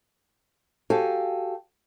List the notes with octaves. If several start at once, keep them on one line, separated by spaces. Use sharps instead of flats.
F#4 G4 A4 F5 G#5